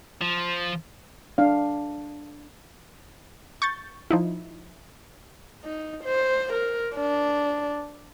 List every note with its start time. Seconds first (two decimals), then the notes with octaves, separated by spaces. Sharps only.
0.22 F3
1.38 D4 F5
3.62 C#6 G6 A6
4.11 F3 D#4 E4
5.64 D#4
6.04 C5
6.53 A#4
6.96 D4